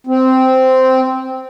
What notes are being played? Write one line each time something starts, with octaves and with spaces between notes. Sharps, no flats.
C4